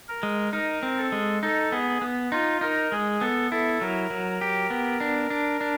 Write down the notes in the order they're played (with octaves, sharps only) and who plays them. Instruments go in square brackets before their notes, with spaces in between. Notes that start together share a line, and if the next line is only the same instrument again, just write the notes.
[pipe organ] A#4
[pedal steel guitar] G#3
[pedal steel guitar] D#4 [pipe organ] A#4
[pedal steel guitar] C4
[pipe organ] A4
[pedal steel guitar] G#3
[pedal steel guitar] D#4 [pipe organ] A4
[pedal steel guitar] B3 [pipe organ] G#4
[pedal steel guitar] B3
[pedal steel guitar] D#4 [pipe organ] F4
[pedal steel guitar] D#4 [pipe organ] A#4
[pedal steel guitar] G#3 [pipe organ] G#4
[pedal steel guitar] B3 [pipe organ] A4
[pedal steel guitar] E4 [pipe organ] A4
[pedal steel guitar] F#3 [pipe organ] A#4
[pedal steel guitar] F#3
G4
B3
D4
D4
D4